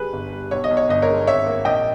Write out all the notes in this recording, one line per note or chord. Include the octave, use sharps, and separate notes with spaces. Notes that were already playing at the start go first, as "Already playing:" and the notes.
Already playing: G3 G#4 B4
G1
G3
B1 C#5
D#5
B1
C#5
G1 D#5
A#4 C#5
G#3
G#1 C#5 E5
A#3
A#1 D#5 G5